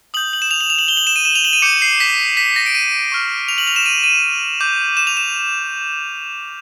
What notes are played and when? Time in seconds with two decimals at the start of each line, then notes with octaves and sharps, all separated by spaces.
0.14 D#6 G6 F#7
0.33 F#7
0.42 E7
0.51 F7
0.61 F#7
0.70 F7
0.79 F#7
0.88 G7
0.97 F#7
1.07 E7
1.16 D#7
1.25 E7
1.35 F7
1.45 F#7
1.53 D#7
1.62 D6 G6 C#7
1.82 C7
2.00 B6
2.37 B6
2.56 A#6
2.66 D7
2.75 D#7
3.12 C#6 F6
3.49 F7
3.58 F#7
3.67 F7
3.76 E7
3.86 D#7
4.04 D#7
4.61 D6 G6
4.97 E7
5.07 F7
5.17 E7